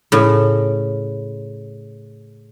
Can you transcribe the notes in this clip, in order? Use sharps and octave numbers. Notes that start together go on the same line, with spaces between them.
A2 C#3